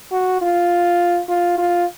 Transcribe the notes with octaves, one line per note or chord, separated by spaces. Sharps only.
F#4
F4
F4
F4